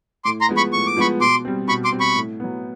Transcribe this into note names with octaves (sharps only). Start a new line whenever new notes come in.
A2 C6 D6
A#5 C6
F3 G#3 B3
B5 C#6
A2 C#6
D6
F3 G#3 B3 B5 C#6
B2 C6 D6
G3 C4
B2 B5 C#6
C6 D6
G3 C4
B5 C#6
A2
F#3 B3